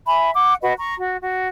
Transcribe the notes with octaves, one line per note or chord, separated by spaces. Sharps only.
E5 G#5 B5
F#5 D6
F#4 B4 D#5
A#5 C#6
F#4
F#4